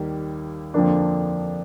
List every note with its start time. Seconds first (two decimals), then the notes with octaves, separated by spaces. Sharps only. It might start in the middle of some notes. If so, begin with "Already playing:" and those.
Already playing: D#2 D#3 G3 A#3
0.74 F2 D3 F3 A#3 D4